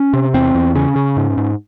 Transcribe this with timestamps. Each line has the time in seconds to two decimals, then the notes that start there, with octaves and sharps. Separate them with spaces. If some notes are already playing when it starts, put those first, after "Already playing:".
Already playing: C#4
0.13 C3
0.34 E2 C4
0.54 E2
0.75 C#3 C#4
0.96 C#3
1.17 G#2
1.37 G#2